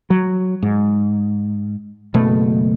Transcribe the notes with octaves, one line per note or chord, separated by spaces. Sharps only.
F#3
G#2
F#1 B2 A3